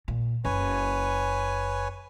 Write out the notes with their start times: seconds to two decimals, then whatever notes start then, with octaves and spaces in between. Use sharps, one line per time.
0.08 A#2
0.45 F#1 B4 C#5 G#5